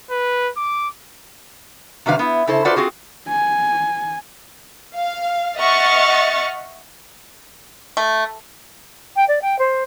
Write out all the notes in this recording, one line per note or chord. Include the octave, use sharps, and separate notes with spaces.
B4
D6
C3 D#3 F#3 D4 B4 F5
B3 E4
C#3 E4 A4 C5
F4 F#4 A4 B4 C5 D5
C4 F4 F#4 G#4
G#5
F5
D#5 E5 F#5 C#6 F6 A6
A3
G5
D5
G5
C5